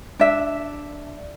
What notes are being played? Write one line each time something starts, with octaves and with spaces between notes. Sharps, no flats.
D4 E5